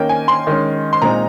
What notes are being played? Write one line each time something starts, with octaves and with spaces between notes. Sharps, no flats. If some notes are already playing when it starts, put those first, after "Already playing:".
Already playing: D#3 A#3 C#4 G5
G#5
C6
D#3 G#3 C#4
C6
A#2 G#3 C4 D#4 A#5